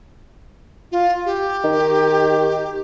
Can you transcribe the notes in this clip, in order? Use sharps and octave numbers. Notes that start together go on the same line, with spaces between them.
F4
G4
D#3